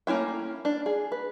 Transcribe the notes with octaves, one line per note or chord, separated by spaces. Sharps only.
A3 A#3 C#4 E4 G5
D4
G#4
B4